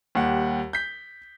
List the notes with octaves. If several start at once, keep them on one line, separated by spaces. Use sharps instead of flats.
D#2 G3 F#5
G6 B6